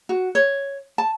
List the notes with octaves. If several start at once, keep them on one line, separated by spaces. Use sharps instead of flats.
F#4
C#5
A5